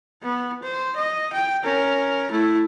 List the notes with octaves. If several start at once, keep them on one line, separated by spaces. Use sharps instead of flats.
B3
C5
D#5
G5
C#4 A#4
A3 E4